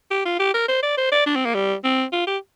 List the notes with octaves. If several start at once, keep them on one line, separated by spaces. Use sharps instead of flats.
G4
F4
G4
A#4
C5
D5
C5
D5
D4
C4
A#3
G3
C4
F4
G4